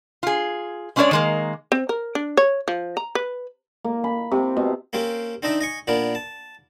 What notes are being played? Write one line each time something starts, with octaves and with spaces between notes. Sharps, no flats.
F4 G#4
G#3 C#4 D4 E4 C#5 D5
D#3 G#3 A#3
C4
A#4
D4
C#5
F3
A#5
B4
A#3
B5
C3
B2
A#3 C4 C#4 G4
C4 D4 D#4 D#5 E5
D#5 G#5 C#6
A#2 B3 D4 A#4
A5